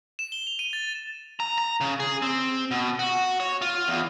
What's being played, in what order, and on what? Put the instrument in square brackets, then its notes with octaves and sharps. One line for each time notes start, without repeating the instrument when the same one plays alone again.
[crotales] E7
G7
F7
D#7
A6
[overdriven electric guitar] A#5
A#5
C#3
G#4
C4
B2
F#4
C#5
F4
E2